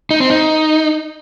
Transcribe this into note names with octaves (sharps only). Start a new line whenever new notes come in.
D#4
C4
D#4